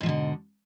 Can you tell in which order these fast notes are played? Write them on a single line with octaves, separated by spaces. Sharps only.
G#2 F3 B2 D3